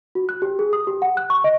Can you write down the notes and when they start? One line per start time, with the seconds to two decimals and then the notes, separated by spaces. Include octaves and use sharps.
0.15 F#4
0.29 F#6
0.42 G4
0.59 G#4
0.73 D#6
0.87 G4
1.02 F#5
1.17 F#6
1.30 C#6
1.44 D#5